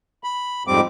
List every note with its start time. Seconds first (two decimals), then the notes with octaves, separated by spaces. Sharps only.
0.24 B5
0.67 F2 G#2 G3 C4 D6